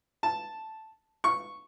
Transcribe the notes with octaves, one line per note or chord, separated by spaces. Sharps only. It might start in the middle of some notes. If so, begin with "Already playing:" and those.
A5
C#6